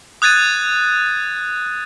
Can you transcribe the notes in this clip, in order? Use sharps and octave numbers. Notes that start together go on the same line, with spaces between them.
D#6 F#6 G#6 A6 D#7